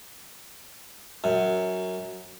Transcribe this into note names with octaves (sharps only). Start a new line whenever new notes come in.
F#2